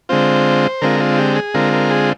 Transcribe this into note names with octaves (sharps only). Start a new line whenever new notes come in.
D3 G#3 C4 F4 C5
D3 G#3 C4 F4 A#4
F4
G4
G#4
D3 G#3 C4 F4 A#4
A#4
G#4